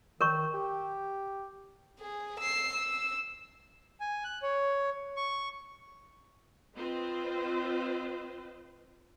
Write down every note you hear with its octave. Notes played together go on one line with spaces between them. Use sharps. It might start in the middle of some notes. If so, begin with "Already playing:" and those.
D#3 A#4 C#5 C#6
G4
G#4
E6 C7
E6
G#5
F#6
C#5
C#6
C4 F4 B4 C5 D#5